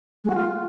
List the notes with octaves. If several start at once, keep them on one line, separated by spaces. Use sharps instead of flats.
G#3
F#4
F4